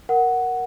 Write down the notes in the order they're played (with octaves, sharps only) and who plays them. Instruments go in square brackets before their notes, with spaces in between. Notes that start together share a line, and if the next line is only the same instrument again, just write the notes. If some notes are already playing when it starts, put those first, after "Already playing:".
[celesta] A#4 F#5